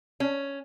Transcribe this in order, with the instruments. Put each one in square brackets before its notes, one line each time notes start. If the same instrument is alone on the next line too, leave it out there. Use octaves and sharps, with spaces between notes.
[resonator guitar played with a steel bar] C#4